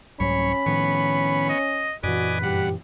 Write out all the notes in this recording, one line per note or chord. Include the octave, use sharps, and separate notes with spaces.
C2 G#2 F#3 C#4 C#5 B5
A2 D#3 F3 B3 C#5
D#5
F#2 A#2 E3 F#4 B4 D5 D#5 G#5
G2 G4 F#5